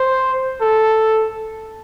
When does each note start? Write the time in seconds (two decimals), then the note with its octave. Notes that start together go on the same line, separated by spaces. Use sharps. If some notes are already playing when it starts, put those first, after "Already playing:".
Already playing: C5
0.61 A4